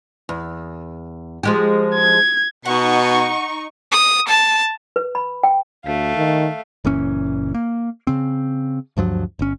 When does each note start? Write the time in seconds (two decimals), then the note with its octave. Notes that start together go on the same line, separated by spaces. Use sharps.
0.29 E2
1.43 F3 G#3 G4
1.94 G#6
2.65 B2 D#4 F#5 C#6
3.92 D#6
4.28 A5
4.96 B4
5.15 B5
5.43 G5
5.85 D2 A3 F5
6.17 D#3
6.85 F#1 A#2 E3 C#4
7.54 A#3
8.07 C#3 C4
8.97 D2 G2 F3 F#3
9.39 G1 C#4